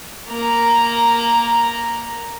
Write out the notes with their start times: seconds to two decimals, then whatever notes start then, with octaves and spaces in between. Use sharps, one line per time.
0.29 A#3 A#5